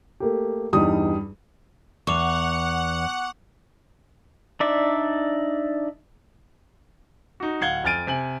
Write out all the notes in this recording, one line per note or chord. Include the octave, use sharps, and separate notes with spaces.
A3 A#3 G4
E2 G2 G3 D#4 D#6
E2 F#5 C#6 D6 F7
D4 D#4 D5 E5
D#4 F#4
D1 F5 F#5 G#6 G7
F2 G#5 F6 A6 D7 D#7
C3 G#5 F#7